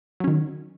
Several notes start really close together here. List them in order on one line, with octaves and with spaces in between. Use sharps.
F#3 C#4 D#3